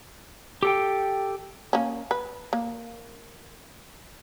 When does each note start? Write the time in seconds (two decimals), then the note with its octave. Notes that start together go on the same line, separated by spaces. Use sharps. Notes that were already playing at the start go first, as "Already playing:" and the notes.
0.63 G4 A4 G5
1.73 A#3 C#4
2.11 B4
2.53 A#3